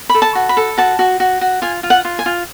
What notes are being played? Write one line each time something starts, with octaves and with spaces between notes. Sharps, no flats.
B5
A4
A5
F#4
B5
A4
F#4 A5
F#4
F#4
F#4
F4 G#5
F4
F#5
F4
G#5
F4